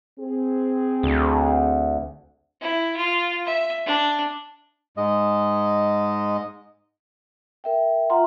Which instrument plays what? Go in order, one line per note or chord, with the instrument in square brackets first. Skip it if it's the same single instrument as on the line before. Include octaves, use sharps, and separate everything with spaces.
[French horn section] C4 G#4
[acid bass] D2
[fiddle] E4
F4
E5
D4
[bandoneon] G#2 G#3 D#5
[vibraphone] A#4 E5 G5
F4 E5 F#5 A#5 C6